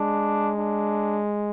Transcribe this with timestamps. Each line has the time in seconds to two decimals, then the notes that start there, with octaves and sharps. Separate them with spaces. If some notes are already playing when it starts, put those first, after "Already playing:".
Already playing: G#3 D4
0.58 D4